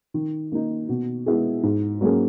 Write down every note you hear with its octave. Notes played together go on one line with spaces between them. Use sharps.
D#3
A#3 D#4
B2
G#3 B3 E4 G#4
G#2
F#3 A#3 C#4 G#4